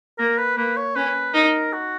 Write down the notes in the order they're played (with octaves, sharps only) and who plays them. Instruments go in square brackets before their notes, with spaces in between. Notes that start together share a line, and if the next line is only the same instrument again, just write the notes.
[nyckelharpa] A#3 [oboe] A#4
[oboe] B4
[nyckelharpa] A#3 [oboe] B4
[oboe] C#5
[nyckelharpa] C#4 [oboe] B4
[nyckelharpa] D#4 [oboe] A#4
[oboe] F#4